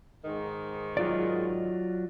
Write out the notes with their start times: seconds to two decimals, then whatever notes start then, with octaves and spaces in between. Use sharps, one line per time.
0.25 G#2 D#3
0.97 F#3 F4 D5